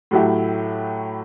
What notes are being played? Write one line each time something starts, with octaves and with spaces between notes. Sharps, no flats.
A2 F#3 A3 E4 G4